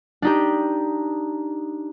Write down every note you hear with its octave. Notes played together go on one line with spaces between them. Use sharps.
D4 D#4 G4